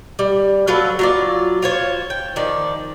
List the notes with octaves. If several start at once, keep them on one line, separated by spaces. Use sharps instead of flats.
G3
F#3 F4 A4 B4
F#3 F4 D5
F4 C5 C#5
G5
D#3 F3 D5